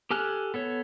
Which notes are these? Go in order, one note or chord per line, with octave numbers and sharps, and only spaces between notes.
G4 A4 G#5 F6 F#6
B3 A4 C#5